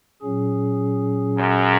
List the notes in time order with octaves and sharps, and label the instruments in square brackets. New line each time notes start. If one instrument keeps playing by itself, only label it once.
[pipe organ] A#2 F#3 C#4 G#4
[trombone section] F#2